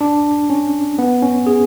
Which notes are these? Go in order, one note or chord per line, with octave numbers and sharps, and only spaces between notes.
D4
C#4
B3
C#4
G#4